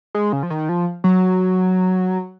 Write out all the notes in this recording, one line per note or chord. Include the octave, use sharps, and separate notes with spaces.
G#3
C#3
F3
D#3
F3
F#3